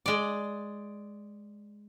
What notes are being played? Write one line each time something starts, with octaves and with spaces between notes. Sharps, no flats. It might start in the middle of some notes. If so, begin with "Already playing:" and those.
G#3 D5